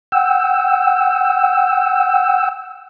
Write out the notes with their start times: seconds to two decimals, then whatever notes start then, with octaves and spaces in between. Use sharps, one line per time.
0.12 F#5 G5 E6